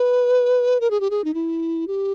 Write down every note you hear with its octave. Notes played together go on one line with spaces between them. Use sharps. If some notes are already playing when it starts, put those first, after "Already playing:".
Already playing: B4
A#4
G#4
G4
G#4
D#4
E4
G4